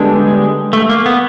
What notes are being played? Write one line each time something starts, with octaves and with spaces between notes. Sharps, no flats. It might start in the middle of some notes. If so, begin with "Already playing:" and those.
Already playing: D3 G3 G#3 B3 D4 G4
A3
A#3
B3